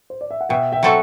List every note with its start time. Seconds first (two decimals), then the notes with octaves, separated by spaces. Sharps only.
0.10 C5
0.21 D5
0.31 E5
0.41 F#5
0.49 B2 E5 G5
0.72 E5 G5
0.83 F#3 C4 F#4 A4